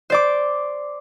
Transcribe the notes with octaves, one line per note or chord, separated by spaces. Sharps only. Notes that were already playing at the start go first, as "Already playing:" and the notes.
C5 D5 D6